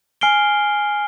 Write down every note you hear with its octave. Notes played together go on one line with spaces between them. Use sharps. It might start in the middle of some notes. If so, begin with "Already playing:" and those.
G#5 F6 C7 D7 G7